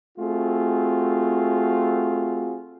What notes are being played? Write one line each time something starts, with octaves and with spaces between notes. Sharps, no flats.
A3 C4 F4 F#4 G#4